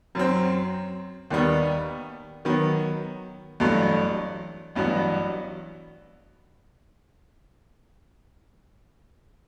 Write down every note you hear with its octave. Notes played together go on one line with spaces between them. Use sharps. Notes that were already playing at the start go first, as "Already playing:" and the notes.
F#2 F#3 C4
D#2 D#3 G3 B3
D#3 F#3 B3
A1 G2 F#3 A3
A1 G2 F#3 B3 F#4